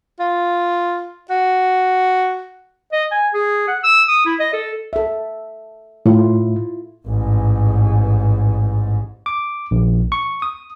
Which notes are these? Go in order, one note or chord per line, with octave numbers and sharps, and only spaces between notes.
F4
F#4
D#5
G#5
G#4
F#5
E6
D#6
E4
D#5
A4
A4 E5
A2 E4 F4
A1 G#2
D6
A#1
C#6
D#6